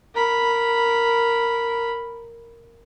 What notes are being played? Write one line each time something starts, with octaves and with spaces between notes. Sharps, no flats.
A#4 B5